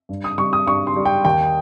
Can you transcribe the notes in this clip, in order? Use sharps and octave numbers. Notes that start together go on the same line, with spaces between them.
G2
D#6
G3 C#6
D#6
G2 C#6
C6
G3
G5
D#2 G5